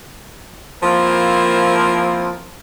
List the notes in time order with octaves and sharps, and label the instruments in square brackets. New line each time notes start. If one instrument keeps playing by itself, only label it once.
[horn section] F3 A#3 C4 E4 A#4